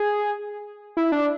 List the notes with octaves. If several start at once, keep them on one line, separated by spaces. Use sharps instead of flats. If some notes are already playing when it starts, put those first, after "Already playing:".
Already playing: G#4
E4
D4